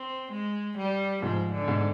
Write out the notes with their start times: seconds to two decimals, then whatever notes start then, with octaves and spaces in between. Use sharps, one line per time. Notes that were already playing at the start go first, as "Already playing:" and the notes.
Already playing: C4
0.31 G#3
0.77 G3
1.22 G#2 F3
1.52 D3
1.68 G#2